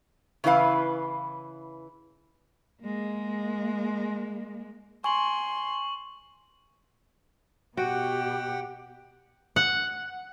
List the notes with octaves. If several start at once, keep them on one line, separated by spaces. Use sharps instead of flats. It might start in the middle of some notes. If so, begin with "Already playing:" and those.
C#3 E3 E4 B4 F5
G#3 A#3
G#5 C6 C#6 F#7
B2 F#4 G4 F#5 G5
F#5